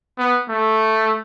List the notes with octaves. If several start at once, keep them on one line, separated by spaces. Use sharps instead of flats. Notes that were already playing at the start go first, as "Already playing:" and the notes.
B3
A3